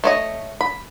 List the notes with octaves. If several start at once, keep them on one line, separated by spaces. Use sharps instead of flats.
A3 C#5 D#5
B5